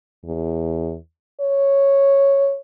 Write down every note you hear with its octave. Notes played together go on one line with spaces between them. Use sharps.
E2
C#5